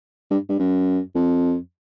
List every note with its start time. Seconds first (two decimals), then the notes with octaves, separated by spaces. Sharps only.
0.30 G2
0.49 G2
0.59 F#2
1.15 F2